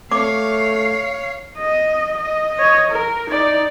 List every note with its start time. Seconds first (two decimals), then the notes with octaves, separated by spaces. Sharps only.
0.12 A3 C#5 F5 D6
1.57 D#5
2.18 D#5
2.54 C#5 D#5
2.91 A#4
3.29 D#4 D5